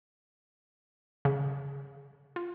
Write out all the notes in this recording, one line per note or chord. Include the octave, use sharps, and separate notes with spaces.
C#3
F4